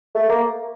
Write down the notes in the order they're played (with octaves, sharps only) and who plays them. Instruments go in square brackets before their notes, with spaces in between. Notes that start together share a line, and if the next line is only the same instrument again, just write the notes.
[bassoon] A3
A#3